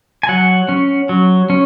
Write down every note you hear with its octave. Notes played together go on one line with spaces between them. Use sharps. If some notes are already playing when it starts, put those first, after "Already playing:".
G#5
F#3 F#5
C#4
F#3
C#4